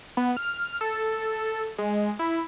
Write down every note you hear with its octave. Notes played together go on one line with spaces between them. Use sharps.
B3
F6
A4
G#3
E4